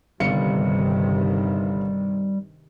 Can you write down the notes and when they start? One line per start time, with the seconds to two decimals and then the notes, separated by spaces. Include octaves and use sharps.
0.20 G1 G2 C3 D#3 G3 F5 C#7